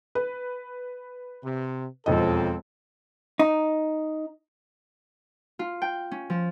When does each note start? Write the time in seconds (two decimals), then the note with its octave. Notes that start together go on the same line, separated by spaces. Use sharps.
0.15 B4
1.43 C3
2.06 E1 F2 F3 C4 A4 D#5
3.39 D#4
5.59 F4
5.82 G5
6.11 C#4
6.30 F3